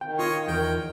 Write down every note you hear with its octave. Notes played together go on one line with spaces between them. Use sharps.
D#3 G5
F4 C#5 D#5
E2 A#4 G5